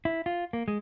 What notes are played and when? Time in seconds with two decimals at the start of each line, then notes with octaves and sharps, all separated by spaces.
0.05 E4
0.26 F4
0.53 A#3
0.68 G#3